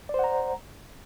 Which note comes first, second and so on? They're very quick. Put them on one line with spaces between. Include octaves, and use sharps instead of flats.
D5 C5 F#5 A#5